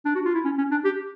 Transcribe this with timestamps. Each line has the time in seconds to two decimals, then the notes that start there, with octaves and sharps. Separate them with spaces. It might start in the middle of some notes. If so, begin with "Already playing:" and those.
0.06 D4
0.15 F#4
0.25 F4
0.35 E4
0.45 C#4
0.58 C#4
0.72 D4
0.85 G4